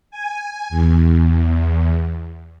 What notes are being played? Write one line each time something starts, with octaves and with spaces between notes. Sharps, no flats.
G#5
E2